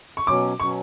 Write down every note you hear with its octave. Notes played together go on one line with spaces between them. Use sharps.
C#6
B2 F#3 C#4 D6
B2 F#3 C#4 C#6